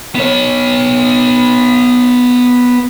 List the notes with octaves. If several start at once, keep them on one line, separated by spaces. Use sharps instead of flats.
B3 C#5